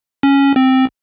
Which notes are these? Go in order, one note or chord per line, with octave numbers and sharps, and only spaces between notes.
C#4
C4